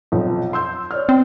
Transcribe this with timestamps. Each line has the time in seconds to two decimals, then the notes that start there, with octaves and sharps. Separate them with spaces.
0.12 B1 F2 F3
0.53 C6 E6 G6
0.91 C#5 D5 F6
1.09 C4